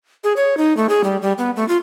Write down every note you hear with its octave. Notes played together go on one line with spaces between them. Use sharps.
G#4
C#5
D#4
A3
G#4
G3
G3
B3
A3
F4